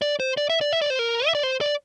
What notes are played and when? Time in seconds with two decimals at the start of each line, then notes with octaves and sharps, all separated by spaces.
0.02 D5
0.20 C5
0.37 D5
0.50 E5
0.61 D5
0.73 E5
0.82 D5
0.90 C5
0.99 A#4
1.27 E5
1.35 D5
1.43 C5
1.61 D5